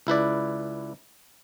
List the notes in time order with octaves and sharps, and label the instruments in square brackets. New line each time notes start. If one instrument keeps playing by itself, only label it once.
[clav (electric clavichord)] C#2 E4 B4 D5